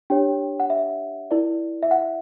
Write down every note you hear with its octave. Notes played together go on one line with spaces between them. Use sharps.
D4 G4 C#5 G5
F#5
E5
E4 A#4 D5
E5
F#5